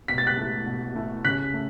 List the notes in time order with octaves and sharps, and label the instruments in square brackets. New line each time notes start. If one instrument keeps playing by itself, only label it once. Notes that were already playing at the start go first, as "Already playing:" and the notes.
[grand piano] B2 [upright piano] B6
[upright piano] A6
F#6 B6
[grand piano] A3 E4
B2
A3 E4
[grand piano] C#3 [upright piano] F#6 B6
[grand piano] A3